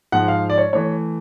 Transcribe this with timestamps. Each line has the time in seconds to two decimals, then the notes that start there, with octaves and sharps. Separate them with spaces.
0.12 G#2 F3 G#3 F#5
0.28 F5
0.50 D5
0.58 C#5
0.73 E3 A3 C#5